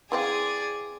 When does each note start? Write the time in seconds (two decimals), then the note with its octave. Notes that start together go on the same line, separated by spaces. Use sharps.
0.12 E3 C4 G#4 D5 F5 G#5